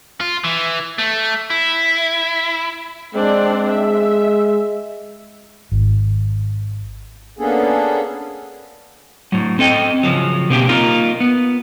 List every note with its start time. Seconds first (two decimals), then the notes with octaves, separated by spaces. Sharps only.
0.20 F4
0.44 E3
0.98 A3
1.50 E4
3.15 G#3 C4 D4 D5
3.69 E5
5.72 G#1
7.39 A#3 B3 C#4 D4 G#4 A4
9.32 A2 F#3
9.59 C4 A4 D#5 G5
10.03 C#3 F3 F#3
10.49 B2 A#3 C4 G4
10.69 A#3 D#4 F4 A#4
11.20 B3